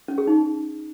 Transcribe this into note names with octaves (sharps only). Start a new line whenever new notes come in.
C#4
G#4
D#4